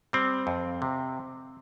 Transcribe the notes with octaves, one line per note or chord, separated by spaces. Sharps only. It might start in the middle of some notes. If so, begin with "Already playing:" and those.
G3 C4
F2
C3